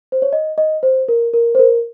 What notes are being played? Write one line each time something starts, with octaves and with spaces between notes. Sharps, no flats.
C5
C#5
D#5
D#5
C5
A#4
A#4
C5
A#4